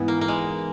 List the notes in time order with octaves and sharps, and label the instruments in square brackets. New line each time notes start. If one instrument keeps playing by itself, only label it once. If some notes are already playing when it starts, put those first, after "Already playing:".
Already playing: [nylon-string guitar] G#2 E3 B3
[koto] A#3
A#3
G#3